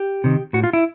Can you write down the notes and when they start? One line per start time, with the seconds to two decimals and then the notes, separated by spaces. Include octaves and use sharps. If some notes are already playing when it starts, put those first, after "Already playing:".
Already playing: G4
0.24 C3 D#3
0.53 A2 F#4
0.64 F4
0.73 E4